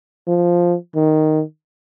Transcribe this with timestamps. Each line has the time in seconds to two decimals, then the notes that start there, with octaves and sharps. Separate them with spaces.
0.28 F3
0.95 D#3